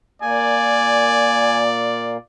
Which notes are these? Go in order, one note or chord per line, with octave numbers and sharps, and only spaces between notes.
A#2 A#3 D5 G#5